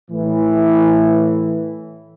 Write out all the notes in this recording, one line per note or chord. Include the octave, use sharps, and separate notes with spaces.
A2 E3